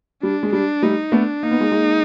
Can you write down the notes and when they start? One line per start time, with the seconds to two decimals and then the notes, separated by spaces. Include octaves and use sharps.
0.22 G3 D4
0.43 G#3
0.53 G3 D4
0.83 G3 A3 D#4
1.12 A3 B3 D4
1.43 A#3 D#4
1.51 B3
1.61 G#3 A#3
1.72 G#3 A#3